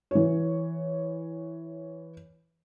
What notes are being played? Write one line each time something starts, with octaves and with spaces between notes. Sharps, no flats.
E3 C#5